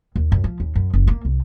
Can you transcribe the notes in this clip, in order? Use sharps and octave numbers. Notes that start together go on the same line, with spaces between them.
D#2
F#2
F3
D#2
F#2
F#1
A#3
C2